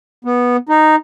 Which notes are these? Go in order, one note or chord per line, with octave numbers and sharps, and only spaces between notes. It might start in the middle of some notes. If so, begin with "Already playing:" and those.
B3
D#4